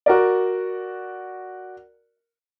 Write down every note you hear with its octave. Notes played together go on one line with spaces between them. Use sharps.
F#4 A#4 D5